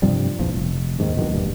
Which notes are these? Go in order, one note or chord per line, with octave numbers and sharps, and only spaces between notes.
G2 C3 F3 G3
A#1 E2 F3
F1
D#2 G#2 C3 D#3
D1 A#1 B2 D#3
E1 G2